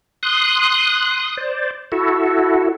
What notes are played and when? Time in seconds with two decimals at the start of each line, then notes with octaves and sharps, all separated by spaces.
0.23 C6 D#6 F#6
1.37 C5 D5
1.92 E4 F#4 A4